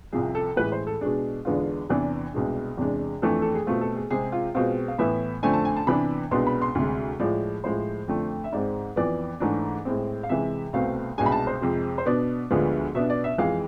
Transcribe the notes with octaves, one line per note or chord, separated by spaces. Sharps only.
C2 C3 F3 G#4
A4
A2 E3 G#3 B4
C5
A4
B2 G#3 D4 G#4
E2 D3 G#3 B3 D4 F4
E2 C3 E3 B3 D4
C2 B2 G#3 D4
E2 C3 G#3 D4
F2 E3 A3 D4 A4
A4
G#4
B2 A3 C4 F4
A4
G#4
C3 G#3 C4 G#4
F4
B2 G#3 C4 F4
F5
A2 E3 B3 E5
F2 D3 A3 C4 G#5
A5
G#5
A5
C3 E3 B3 D4 B5
C2 B2 G#3 B3 D4 C6
B5
C6
D2 C3 G#3
A2 F3 G#3 D5
A2 F3 G#3 C5
F2 D3 A3
E5
G#2 G#3 C4 D5
F2 E3 B3 D5
G#2 E3 A3 D4
A2 G#3 C4
F5
C3 E3 G#3 E5
C2 B2 A3 C4 F5
C2 B2 G#3 D4 G#5
B5
A5
C5
F2 C3 G#3
C5
B2 B3 D4 D5
D2 D3 F3 G#3 B3
B2 B3 D4 E5
D5
E5
F2 E3 G#3 F5